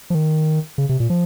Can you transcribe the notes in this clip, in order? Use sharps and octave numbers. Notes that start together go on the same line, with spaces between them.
F3
D#3
C#3
C3
A#2
F3